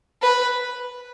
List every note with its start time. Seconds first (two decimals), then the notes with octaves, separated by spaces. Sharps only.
0.22 B4